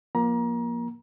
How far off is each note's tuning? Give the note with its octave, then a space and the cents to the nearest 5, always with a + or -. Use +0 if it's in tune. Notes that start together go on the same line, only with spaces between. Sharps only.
F3 +0 A#3 +20 A#5 +30